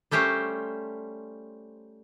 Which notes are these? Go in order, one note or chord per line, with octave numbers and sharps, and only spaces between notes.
G3 A3 C#4 G4 C5